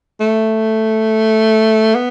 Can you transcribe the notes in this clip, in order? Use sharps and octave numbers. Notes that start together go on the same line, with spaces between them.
A3
B3